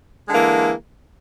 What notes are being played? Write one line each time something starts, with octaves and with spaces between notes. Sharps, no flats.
D3 E3 G#3 A#3